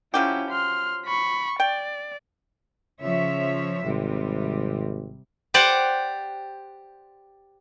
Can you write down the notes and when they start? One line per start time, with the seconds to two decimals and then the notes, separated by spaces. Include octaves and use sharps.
0.14 F3 F#3 C#4 E4 G4
0.50 C6 F6
1.06 B5 C#6
1.60 D5 G5
3.01 C#3 F3 C#5 E5
3.85 G#1 C3 G3
5.54 G4 C5 D5 F#5